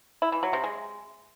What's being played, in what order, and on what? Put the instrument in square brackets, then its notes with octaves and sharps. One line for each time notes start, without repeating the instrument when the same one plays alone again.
[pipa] E4
E3
F#3
C3
G#3